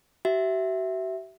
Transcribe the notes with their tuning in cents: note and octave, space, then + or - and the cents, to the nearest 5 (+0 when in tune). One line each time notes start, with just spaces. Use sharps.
F#4 +45 E5 +0